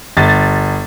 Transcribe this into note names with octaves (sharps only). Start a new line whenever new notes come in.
G1 A6